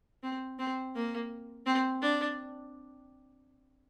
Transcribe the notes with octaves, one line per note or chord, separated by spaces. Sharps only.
C4
C4
A#3
C4
D4